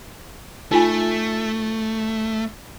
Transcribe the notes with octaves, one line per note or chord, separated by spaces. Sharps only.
A3 D#4 F4 G#5